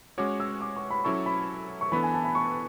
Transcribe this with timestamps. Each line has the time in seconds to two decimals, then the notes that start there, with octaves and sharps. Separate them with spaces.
0.18 G#3 C#4 F#4 C#5 D6
0.40 E6
0.61 D6
0.76 C#6
0.90 B5
1.04 F#3 C#4 E4 A4 C#6
1.26 B5
1.81 C#6
1.92 E3 B3 D4 A4 B5
2.03 G#5
2.14 A5
2.24 B5
2.35 C#6